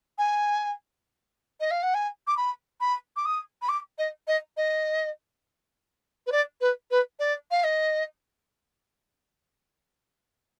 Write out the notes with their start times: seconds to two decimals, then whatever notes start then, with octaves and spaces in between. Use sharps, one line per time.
0.18 G#5
1.60 D#5
1.71 F5
1.83 F#5
1.94 G#5
2.27 D6
2.37 B5
2.81 B5
3.17 D6
3.25 D#6
3.62 B5
3.69 D6
3.98 D#5
4.27 D#5
4.57 D#5
6.27 B4
6.32 D5
6.61 B4
6.91 B4
7.19 D5
7.51 F5
7.64 D#5